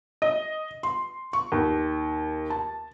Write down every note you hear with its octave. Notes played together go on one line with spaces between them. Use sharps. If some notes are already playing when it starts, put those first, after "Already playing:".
D#5
C6
C#6
D#2
A5